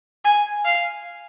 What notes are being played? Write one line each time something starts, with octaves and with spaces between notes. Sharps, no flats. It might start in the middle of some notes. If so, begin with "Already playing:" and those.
G#5
F5